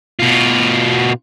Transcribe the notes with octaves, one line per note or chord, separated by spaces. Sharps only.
B2 F4